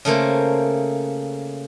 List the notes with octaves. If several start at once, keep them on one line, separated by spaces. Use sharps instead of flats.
C#3 A3 A#3 C5